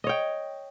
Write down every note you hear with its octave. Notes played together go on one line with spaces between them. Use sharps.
C#5 D#5 G5